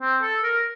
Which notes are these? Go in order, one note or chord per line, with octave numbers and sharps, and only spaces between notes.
C4
A4
A#4